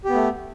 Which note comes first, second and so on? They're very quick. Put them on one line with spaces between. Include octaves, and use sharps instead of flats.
G4 B3 A3